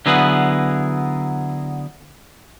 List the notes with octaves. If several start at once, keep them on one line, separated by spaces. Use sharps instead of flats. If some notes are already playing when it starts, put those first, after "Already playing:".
D3 F#3 B3 E4 G#4 B4